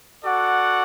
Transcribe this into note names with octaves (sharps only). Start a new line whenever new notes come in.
F#4 A4 D5 F#5